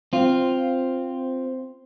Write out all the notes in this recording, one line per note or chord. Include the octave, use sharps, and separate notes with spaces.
C4 F4